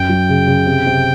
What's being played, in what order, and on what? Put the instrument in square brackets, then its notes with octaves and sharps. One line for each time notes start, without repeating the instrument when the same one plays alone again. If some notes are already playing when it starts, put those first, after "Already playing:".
Already playing: [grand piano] F#2 [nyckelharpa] G5
[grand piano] F#3
C#3
C#3
C3
C3